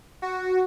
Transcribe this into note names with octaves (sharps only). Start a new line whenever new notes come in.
F#4